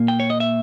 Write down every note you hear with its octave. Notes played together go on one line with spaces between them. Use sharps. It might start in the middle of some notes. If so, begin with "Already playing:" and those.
Already playing: A#2 A#3
G5
C#5
D#5
E5